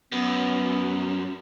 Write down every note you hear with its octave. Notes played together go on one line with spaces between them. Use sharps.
F#2 B3